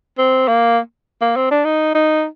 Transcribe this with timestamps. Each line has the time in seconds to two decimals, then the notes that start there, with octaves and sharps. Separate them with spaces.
0.18 C4
0.48 A#3
1.21 A#3
1.36 C4
1.51 D4
1.65 D#4
1.95 D#4